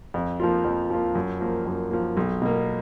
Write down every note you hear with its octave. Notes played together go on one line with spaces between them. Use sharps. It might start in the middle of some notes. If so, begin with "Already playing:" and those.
F2
F3 A#3 F4
F2
F3 A#3 F4
F#2
F3 A#3
F#2
F3 A#3
B1
B2 A#3